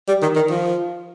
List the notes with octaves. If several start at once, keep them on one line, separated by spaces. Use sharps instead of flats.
G3
D#3
D#3
F3